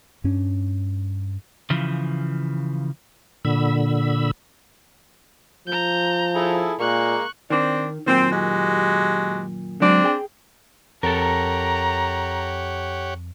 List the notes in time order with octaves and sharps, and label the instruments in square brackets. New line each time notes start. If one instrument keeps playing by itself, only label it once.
[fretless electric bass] G2 C#4 D4
[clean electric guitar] C#3 E3 F3
[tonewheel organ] A#2 D3 B5 E6
[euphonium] F3 [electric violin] A#5 G6
[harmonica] E4 G#4 A4
[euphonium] A#2 [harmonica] G#3 A#3 [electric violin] C#6 F#6
[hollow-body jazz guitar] D#3 [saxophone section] C4 D4
[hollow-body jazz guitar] F#2 A#2 D#3 [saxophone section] C4
[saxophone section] G#3 F#4 G4
[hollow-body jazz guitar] D3 F#3 G#3 [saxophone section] C4 D4
[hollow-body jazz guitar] G#4 G5
[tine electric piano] F2 [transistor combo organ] G4 C#5 F#5 [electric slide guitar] A4 A#4 [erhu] A#5